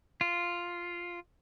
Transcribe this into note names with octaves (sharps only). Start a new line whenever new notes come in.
F4